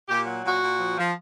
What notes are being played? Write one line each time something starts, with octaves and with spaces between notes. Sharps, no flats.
A#2 G4
F#3
A#2 F#4
A#2
F3
F3